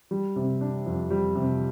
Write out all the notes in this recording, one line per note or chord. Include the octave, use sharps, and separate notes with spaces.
G3
C3
D4
F2
G3
C3